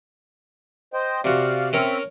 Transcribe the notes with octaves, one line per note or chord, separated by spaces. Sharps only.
C5 D#5 G5
C3 F#4 D5 F5
C4 C#4 A#4 C#5 E5